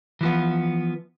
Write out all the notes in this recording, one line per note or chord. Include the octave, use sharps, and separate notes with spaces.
E3 F3 B3